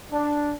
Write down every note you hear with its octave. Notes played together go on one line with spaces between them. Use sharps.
D4